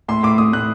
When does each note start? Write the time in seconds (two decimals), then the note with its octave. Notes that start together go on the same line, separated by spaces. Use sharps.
0.08 A2 C6
0.23 A2 D6
0.38 A2 D#6
0.53 A2 F#6